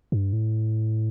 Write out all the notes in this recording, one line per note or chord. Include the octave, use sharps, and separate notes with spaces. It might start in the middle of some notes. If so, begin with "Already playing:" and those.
G2
A2